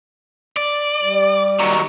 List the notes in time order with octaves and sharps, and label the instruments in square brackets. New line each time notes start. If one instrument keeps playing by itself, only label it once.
[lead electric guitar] D5
[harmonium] G3
[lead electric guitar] D#3 F#3